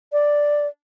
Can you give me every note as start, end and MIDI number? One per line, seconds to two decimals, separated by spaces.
0.12 0.67 74